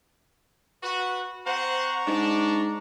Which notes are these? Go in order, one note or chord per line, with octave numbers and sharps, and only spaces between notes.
F#4 B4
C4 C5 F#5 A#5 C#6
G#2 D4